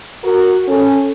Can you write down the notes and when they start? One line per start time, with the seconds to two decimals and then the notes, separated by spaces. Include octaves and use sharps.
0.24 F#4 A#4
0.67 C#4 A4